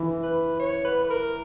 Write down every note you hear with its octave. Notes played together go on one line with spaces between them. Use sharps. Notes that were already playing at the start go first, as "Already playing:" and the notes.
Already playing: E3
B4
C#5
B4
B4
A#4